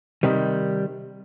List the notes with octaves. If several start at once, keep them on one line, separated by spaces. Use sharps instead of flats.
C3 D#3 G3